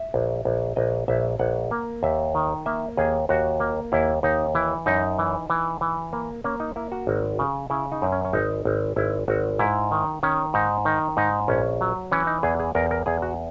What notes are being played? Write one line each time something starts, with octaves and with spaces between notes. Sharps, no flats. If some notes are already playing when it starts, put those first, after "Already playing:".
Already playing: E5
A#1
A#1
A#1 D#5
A#1 E5
A#1 F#5
A#3
D#2 E5
D#3
A#3 E5
D#2 G#4
D#2 F#4
A#3
D#2 E4
D#2 D#4
E3 E4
F#2 D#4
E3
E3
E3
A#3
A#3 C#4
D#4
A#3 E4
F#4
G#1
C#3
C#3 E4
D#4
F#2
C#4
C#4
G#1 D#4
G#1
G#1 E4
G#1 F#4
G#2 E4
D#3
D#3 C#4
G#2 D#4
D#3 D#4
G#2 D#4
A#1 C#4
F#3
E3 C#4
D#4
E2 G#4
G#4
E2 A#4
A#4
E2 G#4
F#4